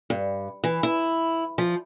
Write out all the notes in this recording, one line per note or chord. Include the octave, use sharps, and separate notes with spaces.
G2
E3
E4
F3